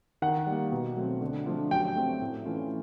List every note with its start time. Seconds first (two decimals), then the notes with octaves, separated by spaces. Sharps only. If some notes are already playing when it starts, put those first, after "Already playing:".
0.22 D#3 F#5
0.47 G3 A#3
0.72 B2
0.97 F#3 A3 C4
1.21 D3
1.46 F3 A3 D4 F4
1.71 F#3 G5
1.96 A3 C4
2.22 A2
2.45 E3 A3 C#4 F4